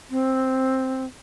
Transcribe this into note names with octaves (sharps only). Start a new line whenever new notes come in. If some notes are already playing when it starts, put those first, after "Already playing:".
C4